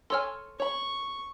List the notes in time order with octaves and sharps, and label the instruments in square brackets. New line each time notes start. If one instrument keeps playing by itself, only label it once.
[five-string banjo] A4 C#5 G#5 [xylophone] C6 E6 F6
[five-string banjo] C#5 B5 [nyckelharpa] C#6